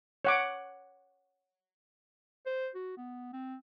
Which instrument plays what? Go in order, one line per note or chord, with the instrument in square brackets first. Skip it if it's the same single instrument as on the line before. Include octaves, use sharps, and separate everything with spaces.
[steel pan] C#5 F#5 D6
[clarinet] C5
F#4
B3
C4